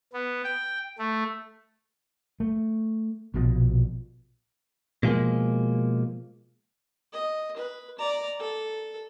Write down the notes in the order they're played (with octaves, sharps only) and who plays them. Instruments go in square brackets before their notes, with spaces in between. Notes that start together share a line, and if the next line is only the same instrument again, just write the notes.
[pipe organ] B3
G5
A3
[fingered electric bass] A3
A#1 B2 E3 F3
[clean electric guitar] B2 F3 G#3 A#3
[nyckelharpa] D#5
B4
D5 A#5
A4